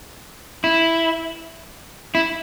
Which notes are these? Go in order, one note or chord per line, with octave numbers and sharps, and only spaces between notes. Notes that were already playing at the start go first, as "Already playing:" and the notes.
E4
E4